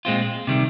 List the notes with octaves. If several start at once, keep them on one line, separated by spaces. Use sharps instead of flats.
A#2 G#3 C4 F4
C3 D#3 G3